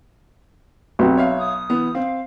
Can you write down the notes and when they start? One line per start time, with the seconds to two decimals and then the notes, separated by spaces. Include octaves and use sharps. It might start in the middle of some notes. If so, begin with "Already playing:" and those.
0.99 B1 C4 G4
1.17 C#5 E5 F5
1.39 D#6
1.70 E3 B3
1.95 C4 F5